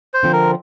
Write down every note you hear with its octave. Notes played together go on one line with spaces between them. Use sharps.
C5
D3 F3 C4
A#4